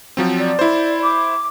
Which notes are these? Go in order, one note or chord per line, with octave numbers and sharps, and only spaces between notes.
F3 F#3 C4
D5
E4 C5
D6